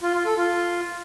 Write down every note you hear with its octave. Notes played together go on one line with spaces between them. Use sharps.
F4
F4
A4
F4